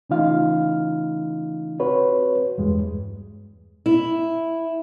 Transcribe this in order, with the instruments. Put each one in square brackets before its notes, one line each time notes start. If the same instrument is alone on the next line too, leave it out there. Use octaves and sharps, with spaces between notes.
[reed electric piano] C#3 E3 A3 D#4 F4 F5
C4 F#4 B4 C#5
E2 G2 G#3
[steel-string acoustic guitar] E4